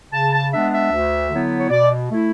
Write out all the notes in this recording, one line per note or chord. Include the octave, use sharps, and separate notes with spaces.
C#3 A5
A5
G#3 B3 D4 E5
E5
D2
D3 F#3 B3 E4
C#5
B2 D5
A3 E4